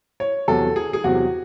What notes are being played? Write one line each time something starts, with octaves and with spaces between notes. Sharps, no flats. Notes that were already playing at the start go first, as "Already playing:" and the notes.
C#5
E2 C3 F#3 A4
G#4
G#4
E2 C3 F#3 F#4